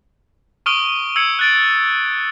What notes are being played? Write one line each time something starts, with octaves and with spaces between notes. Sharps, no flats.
C#6 D#6 F6 D7 G7
E6 G#6 C#7
F#6 A6 D7